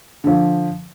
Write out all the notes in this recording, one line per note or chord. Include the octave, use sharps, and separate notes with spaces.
D3 F3